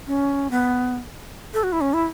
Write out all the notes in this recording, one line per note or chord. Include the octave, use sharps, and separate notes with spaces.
C#4
B3
A4
F#4
E4
C#4
E4